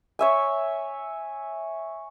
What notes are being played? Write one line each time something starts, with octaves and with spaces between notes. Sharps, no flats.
C#5 E5 G#5